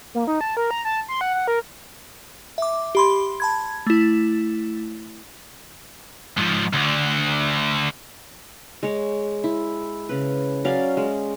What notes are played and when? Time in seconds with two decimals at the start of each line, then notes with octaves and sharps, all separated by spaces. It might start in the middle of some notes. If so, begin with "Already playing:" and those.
0.15 A#3
0.27 D#4
0.41 A5
0.57 A#4
0.71 A#5
0.85 A5
1.09 C6
1.21 F#5
1.34 F#5
1.47 A#4
2.58 E5 D6
2.95 G4 B5 C6
3.40 A5 B5 G#6
3.87 A3 E4
6.37 G#2 F3
6.73 D2 D3
8.83 G#3 C#5
9.44 E4
10.09 C#3 B4
10.64 F#3 C#4 D5 F5
10.97 G#3